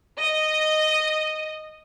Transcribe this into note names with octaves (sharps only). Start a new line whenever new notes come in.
D#5